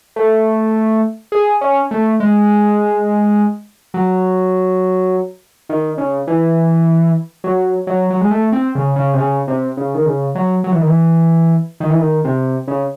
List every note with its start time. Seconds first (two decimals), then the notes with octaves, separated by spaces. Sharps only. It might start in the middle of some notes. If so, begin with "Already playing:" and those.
0.16 A3
1.32 G#4
1.61 C#4
1.91 A3
2.20 G#3
3.94 F#3
5.69 D#3
5.98 C#3
6.27 E3
7.44 F#3
7.87 F#3
8.10 F#3
8.21 G#3
8.31 A3
8.52 C4
8.75 C#3
8.96 C#3
9.13 C3
9.18 C#3
9.48 C3
9.77 C#3
9.95 D#3
10.06 C#3
10.35 F#3
10.64 F#3
10.72 E3
10.79 D#3
10.87 E3
11.80 D#3
11.90 E3
11.99 D#3
12.25 C3
12.68 C#3